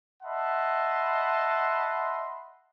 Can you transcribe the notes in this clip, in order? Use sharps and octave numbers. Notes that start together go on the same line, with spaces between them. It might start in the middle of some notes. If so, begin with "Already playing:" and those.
D#5 E5 F#5 A5 B5 C6